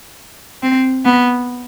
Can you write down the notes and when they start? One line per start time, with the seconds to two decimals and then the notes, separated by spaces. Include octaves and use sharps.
0.63 C4
1.05 B3